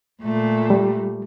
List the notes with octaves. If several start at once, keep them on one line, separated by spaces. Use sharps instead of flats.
A#2 A3
G3